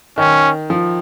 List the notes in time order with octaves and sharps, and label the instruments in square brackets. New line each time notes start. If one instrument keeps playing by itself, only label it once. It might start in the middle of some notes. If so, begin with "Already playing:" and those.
[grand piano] D#3 [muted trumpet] C#4
[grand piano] F3